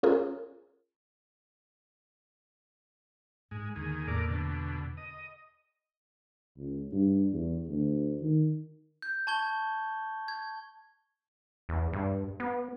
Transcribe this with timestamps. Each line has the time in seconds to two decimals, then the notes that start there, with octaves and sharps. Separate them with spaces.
0.03 C#4 F4 G#4 A#4
3.51 G#2 G#3
3.76 D#2 D3 G#4
4.08 E2 A2 A3 A#3 A#4 D5
4.28 B2 D3
4.97 D#5
6.57 C#2
6.92 G2
7.33 E2
7.69 D2
8.21 D#3
9.02 G6
9.27 A5 C#6 G#6 G7
10.28 G#6
11.69 E2
11.93 G2
12.40 B3